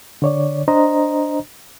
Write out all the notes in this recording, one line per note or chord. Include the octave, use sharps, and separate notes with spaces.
D3 C#5 D5
D4 C5 D#5 A#5